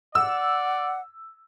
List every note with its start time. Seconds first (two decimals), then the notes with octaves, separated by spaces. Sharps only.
0.15 D5 F#5 E6